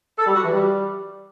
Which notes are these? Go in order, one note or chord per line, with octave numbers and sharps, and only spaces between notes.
A4
G3
F#4
E3
G3